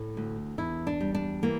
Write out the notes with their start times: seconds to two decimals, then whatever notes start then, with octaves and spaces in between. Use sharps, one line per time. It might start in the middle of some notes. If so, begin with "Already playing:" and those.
Already playing: A2
0.17 D2
0.58 E2 E4
0.87 D4
1.01 G3
1.15 D4
1.43 E3 A#3